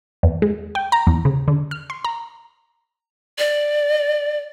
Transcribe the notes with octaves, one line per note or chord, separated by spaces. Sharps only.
E2
G#3
G5
A#5
E2
C#3
D3
F6
C6
A#5
D5